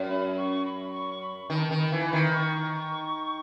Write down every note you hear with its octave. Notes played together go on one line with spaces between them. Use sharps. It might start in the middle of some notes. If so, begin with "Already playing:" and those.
Already playing: F#2
B5
C#6
B5
C#6
B5
D#3 A5 B5
D#3
B5
E3
B5
D#3
C#6